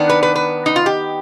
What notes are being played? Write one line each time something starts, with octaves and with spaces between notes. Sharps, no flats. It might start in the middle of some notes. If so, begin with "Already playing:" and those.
Already playing: D#3 B3 D4
B4
B4
B4
D#4
F4
G4